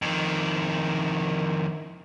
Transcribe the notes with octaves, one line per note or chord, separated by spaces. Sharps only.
F2 D#3